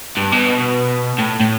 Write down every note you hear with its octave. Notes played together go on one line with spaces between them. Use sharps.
G2
B2
A2
A2